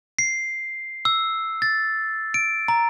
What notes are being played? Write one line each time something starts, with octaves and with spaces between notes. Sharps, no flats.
C7
E6
A6
D7
A#5